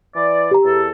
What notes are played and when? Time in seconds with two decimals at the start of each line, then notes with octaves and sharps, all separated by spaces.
0.15 E3 D5
0.51 G4 A#5
0.65 E2 A4